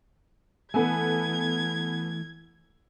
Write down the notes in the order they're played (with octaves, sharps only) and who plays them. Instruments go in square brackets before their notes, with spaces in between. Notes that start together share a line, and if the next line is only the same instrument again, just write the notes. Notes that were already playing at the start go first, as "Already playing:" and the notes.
[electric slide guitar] E3 A3 [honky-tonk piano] B3 A4 G#5 [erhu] G#6